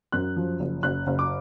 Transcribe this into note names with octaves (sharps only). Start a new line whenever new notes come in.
F#2 F#6
F3
F#1
F#1 F#6
F#1
D6